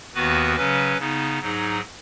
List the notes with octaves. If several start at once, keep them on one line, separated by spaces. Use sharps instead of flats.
D#2 D#3 B3 F#4 B4
C#3 F#3 C#4 B4
C#3 B3 D#4
G#2 F#3 D#4 G#4